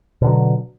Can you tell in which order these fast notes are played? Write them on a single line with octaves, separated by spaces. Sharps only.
B2 D3 F#3